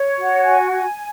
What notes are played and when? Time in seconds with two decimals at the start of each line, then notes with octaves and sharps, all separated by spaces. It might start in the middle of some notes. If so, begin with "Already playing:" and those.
Already playing: C#5
0.19 F#4
0.45 G#5
0.72 G#5